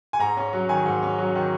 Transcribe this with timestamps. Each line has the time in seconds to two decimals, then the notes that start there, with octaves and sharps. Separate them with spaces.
0.13 G#5
0.19 G#2 A#5
0.37 C#4
0.53 F#3
0.69 D#3 G#5
0.86 G#2
1.03 C#4
1.18 F#3
1.35 D#3